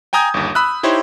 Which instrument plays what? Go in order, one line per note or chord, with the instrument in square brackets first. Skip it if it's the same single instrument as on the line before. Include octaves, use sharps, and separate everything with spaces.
[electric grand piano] G5 G#5 A#5 D#6 G6 G#6
G1 D#2
B5 D#6 E6 F#6
D#4 E4 G4 C5 C#5